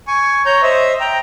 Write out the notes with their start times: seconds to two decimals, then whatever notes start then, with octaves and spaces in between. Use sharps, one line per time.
0.07 G#5 C#6
0.46 C#5 A#5 G6
0.62 C5 D#5 E5
1.00 G5 A#5